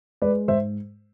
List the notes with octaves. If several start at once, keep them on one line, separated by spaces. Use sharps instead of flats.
G#3 B4 D5
G#2 C5 E5